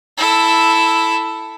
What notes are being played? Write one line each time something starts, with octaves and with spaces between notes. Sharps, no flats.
E4 A4